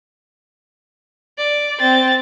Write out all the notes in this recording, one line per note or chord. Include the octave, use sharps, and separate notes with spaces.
D5
C4 A6